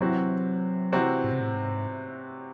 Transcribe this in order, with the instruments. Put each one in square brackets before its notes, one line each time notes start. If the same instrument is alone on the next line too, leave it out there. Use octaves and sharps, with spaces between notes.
[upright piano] C3 E3 C4 F#4 [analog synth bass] F#3
[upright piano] C3 E3 C4 F#4
[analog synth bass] A2
C3
A2
G#2